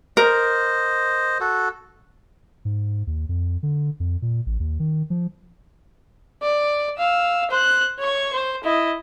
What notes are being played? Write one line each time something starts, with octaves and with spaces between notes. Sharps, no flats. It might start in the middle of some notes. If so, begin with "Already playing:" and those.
A#4 C5 D#5
F#4 A4
G#2
D#2
F2
D3
F2
A#2
A1
D#2
D#3
F3
D5
F5 E6
C5 F#6
C#5 C#6
C5
E4 D#5